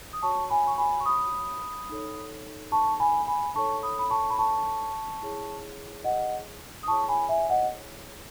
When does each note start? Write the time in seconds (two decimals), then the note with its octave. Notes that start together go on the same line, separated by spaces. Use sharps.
0.13 D#6
0.22 F#4 C#5 A5 C#6
0.50 G#5 B5
0.67 C#6
0.78 G#5 B5
1.00 C#6
1.05 B5 D#6
1.89 D#4 A4 C#5
2.72 A5 C#6
3.00 G#5 B5
3.27 G#5 B5
3.55 D#4 A4 C#5 A5 C#6
3.83 B5 D#6
3.99 B5
4.11 A5 C#6
4.30 B5
4.39 A5 C#6
5.22 E4 G#4 C#5
6.04 D#5 F#5
6.83 D#6
6.87 E4 G#4 C#5 A5 C#6
7.09 G#5 B5
7.29 E5 G#5
7.50 D#5 F#5